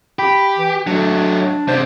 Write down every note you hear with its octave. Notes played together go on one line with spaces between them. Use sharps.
G4 B5
E3
F#3 A3 D4
C3 D4 C5